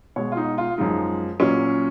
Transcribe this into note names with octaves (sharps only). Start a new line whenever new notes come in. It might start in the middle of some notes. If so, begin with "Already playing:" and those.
B2 G#3 C#5
F4
D#4
F4
F#2 F3 G#3 D#4
A#2 F#3 C#4